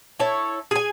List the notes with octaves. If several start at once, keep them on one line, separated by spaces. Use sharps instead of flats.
E4 A4 C#5
G#4 G#5